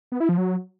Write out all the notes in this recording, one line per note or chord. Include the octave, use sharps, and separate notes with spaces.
B3
E4
F3
F#3